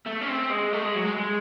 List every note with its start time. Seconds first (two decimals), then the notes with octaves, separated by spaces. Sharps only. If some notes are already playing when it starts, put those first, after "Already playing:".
0.07 A3
0.22 C#4
0.29 C4
0.51 G#3
0.73 A3
0.84 G#3
0.95 F#3
1.05 G#3
1.17 G#3